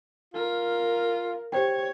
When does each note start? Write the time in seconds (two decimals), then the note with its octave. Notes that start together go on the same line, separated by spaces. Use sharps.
0.34 F4 A#4
1.52 G4 C5 C#5 G5